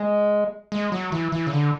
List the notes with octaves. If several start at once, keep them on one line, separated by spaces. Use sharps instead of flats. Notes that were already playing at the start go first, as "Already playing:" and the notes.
Already playing: G#3
G#3
F#3
E3
E3
C#3
D3